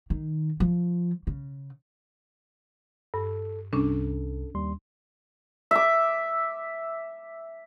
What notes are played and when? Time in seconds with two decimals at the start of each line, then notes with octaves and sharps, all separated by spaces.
0.10 D#3
0.60 F3
1.27 C#3
3.14 G2 A4
3.73 C2 C#4 D4 A4
4.55 D#2 G3 C6
5.71 E5 D6